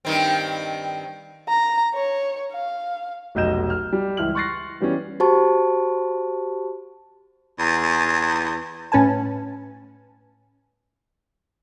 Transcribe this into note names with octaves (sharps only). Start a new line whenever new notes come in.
G2 D#3 C4
A#5
C#5
F5
F1 B1 D#5 G6 E7
F6
G3
C#2 E3 E4 F6 F#7
C6 C#6 F#6 A6 A#6 C7
E3 G3 B3 C#4
F#4 G4 C5 A5 C#6
E2
A2 C#4 B4 G#5 A5